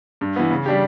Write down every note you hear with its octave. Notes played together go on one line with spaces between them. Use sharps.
G2
E3 B3
C#3
G3 D4 G4